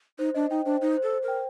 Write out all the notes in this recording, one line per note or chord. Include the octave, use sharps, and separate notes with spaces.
D#4 C5
D4 D#5
D#4 G5
D4 C5
D#4 C5
C5
A4
C5
A#4
G5